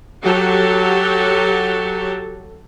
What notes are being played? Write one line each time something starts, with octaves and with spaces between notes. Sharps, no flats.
F#3 F#4 G4 A4